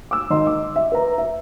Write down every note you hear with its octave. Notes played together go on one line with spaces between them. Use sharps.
D6 E6
G#1 D#4 D#5 C6
D6
E5
B4 A#5
E5